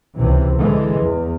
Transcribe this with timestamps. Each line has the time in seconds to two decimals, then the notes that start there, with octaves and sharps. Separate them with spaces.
0.14 C#2 C3 E3
0.57 D3 E3 G#3
1.02 E2